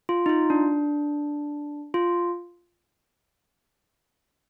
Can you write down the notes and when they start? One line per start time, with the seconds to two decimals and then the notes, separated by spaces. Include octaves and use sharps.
0.09 F4
0.26 D#4
0.29 F4
0.50 D4
1.94 F4